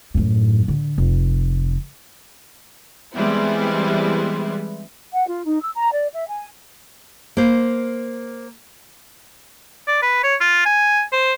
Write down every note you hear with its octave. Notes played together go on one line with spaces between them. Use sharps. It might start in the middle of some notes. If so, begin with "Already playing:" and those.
F#2 A2
D3
F1
E3 G3 G#3 B3 C4 E4
F#5
F4
D#4
E6
A#5
D5
E5
G#5
A#3 C5
D5
B4
C#5
F4
G#5
C5